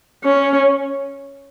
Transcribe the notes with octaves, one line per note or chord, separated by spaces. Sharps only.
C#4